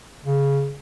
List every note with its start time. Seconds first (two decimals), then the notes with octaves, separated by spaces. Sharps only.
0.25 C#3